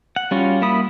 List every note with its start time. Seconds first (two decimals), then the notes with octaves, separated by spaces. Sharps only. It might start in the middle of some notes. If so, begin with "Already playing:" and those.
0.16 F#5
0.31 G3 C#4 F4 F#4
0.62 A#3 E4 B5 D#6